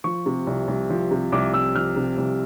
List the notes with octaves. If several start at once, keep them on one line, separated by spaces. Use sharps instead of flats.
F3 C#6
C3
C2
C2
F3
C3
C2 D6
C2 E6
F3 F6
C3
C2